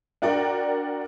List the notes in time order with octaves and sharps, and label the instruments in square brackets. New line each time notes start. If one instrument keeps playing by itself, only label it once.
[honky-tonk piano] D4 F#4 A#4 D5 G5